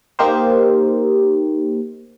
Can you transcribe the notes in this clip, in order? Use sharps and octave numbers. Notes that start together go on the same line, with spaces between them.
A#3 D#4 G4 A#4 C5